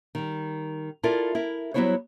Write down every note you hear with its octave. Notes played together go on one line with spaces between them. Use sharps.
D#3 G3
E4 F4 A4 A#4 D5
E4 A#4
F#3 G3 B3 E4 C5 C#5